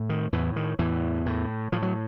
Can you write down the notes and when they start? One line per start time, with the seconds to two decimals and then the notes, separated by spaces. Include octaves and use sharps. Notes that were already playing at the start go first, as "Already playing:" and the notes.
Already playing: A2
0.10 D#3
0.33 E2 A2 E3
0.56 D#3
0.79 E2 A2 E3
1.26 A2
1.72 A2 F3
1.82 F#3